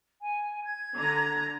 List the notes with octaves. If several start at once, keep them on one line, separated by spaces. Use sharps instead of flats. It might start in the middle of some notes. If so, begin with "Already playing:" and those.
G#5
G#6
D3 A#5